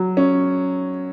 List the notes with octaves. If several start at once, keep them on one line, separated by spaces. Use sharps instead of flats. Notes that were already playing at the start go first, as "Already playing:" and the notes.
Already playing: F#3
C#4